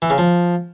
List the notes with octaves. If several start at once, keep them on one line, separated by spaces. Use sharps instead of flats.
E3
C#3
F3